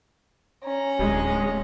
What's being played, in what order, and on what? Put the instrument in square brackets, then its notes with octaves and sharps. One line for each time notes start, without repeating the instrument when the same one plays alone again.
[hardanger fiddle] C#4 A#5
[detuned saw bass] D1 [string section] G#3